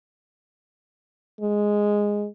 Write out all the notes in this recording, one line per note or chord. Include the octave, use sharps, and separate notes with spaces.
G#3